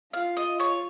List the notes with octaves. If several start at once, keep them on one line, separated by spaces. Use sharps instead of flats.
F4 F5
D#5
C#5